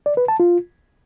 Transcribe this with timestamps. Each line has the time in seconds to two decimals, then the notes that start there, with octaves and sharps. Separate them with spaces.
0.06 D5
0.17 B4
0.28 A5
0.40 F4